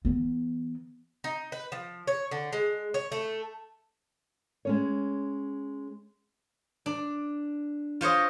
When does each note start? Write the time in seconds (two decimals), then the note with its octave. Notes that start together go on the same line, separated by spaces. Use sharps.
0.05 E3 B3
1.24 D#4
1.52 B4
1.72 F3
2.07 C#5
2.31 D3
2.53 G#3
2.94 C#5
3.12 A3
4.65 G#3 C#4 C#5
6.86 D4
8.01 F4 C5 C#5 D#5